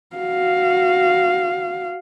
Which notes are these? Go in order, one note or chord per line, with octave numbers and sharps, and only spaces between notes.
F#4 F5